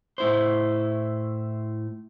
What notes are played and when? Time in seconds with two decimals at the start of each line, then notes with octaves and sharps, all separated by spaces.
0.18 A2 E4 C5